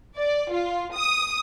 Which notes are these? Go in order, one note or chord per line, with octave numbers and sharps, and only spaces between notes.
D5
F4
D#6